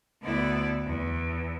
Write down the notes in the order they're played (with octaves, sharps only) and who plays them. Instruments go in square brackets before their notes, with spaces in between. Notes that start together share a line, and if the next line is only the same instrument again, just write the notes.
[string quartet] D2 D3 B3 E4 D5
E2